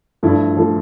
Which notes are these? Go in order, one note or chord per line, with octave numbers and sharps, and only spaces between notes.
G2 F3 A3 E4
F3 A3 E4